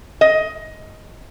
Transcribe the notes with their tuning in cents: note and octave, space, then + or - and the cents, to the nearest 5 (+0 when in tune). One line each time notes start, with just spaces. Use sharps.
D#5 +15